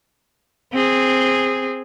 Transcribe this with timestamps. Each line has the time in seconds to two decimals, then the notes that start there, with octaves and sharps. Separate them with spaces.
0.73 C4 G#4